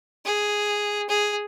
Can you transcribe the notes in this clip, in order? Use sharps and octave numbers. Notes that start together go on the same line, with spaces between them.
G#4
G#4